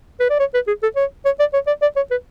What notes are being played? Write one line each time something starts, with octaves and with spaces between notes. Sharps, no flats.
B4
D5
C#5
B4
G#4
A4
C#5
C#5
D5
C#5
D5
D5
C#5
B4